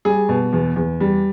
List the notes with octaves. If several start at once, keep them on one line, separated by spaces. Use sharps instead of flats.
G3 G#4
B2
E2
E2
G3